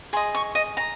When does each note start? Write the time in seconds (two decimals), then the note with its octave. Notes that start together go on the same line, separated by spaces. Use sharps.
0.13 G#4 C6
0.17 D#5
0.35 C#6
0.55 D#5
0.77 A#5